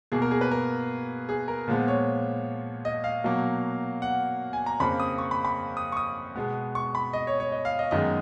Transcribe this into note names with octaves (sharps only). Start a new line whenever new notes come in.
B2 A#3 G#4
A#4
G#4
B4
A#4
G#4
A#4
A#2 F3 G#3 B3
C#5
D#5
F5
B2 F#3 A#3
F#5
G#5
A#5
F2 C#3 F3 A#3 B5
D#6
C#6
B5
B5
D#6
C#6
D#6
B2 G#3 B3
C#6
B5
D#5
C#5
C#5
D#5
F5
D#5
F#2 D#3 G#3 B3 D#5